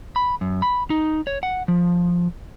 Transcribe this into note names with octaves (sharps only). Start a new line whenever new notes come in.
B5
F#2
B5
D#4
C#5
F#5
F3